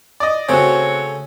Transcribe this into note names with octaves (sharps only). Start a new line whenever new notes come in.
D5 D#5
C#3 A3 C4 F#4 C#5